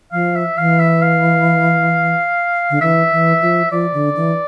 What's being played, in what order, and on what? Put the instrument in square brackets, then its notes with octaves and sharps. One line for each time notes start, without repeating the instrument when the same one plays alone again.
[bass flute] F3 [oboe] F5
[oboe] E5
[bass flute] E3 [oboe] F5
[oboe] E5
F5
[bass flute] D3
[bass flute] E3 [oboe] E5
[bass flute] E3
F3
[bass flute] F3 [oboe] D5
[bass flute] D3
E3